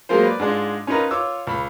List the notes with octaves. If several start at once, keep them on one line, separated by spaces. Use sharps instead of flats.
F#3 G#3 A#3 F4 C5
B4 D5
G#2 G#3 D4 F4
C#4 D#4 F4 A#4 B4 A#5
F4 C#5 D6 E6
C#2 B5